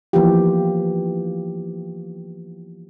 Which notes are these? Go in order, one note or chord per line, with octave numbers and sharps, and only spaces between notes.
E3 F3 A#3 B3 F4 G4